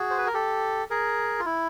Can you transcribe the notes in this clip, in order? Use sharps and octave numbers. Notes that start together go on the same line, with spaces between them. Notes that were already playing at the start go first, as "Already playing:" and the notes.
Already playing: F#4 G#4
C5
B4
A#4
G4 A4
G#4 A#4
F4
E4